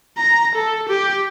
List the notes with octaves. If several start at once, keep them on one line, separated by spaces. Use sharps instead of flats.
A#5
A4
G4